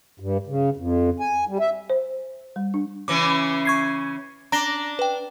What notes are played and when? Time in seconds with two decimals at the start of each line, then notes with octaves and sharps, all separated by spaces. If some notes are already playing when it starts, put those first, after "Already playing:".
0.20 G2
0.47 C#3
0.77 F2
1.20 G#5
1.48 G3
1.60 E5
1.90 C5
2.56 G3
2.74 D4
3.08 C#3 E3 C#4 D6
3.65 C#6 G#6 C7
4.52 D4 A#5 A#6 G7
4.99 B4 G5